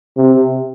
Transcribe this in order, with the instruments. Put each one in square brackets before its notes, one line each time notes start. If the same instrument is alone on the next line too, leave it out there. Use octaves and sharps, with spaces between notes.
[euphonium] C3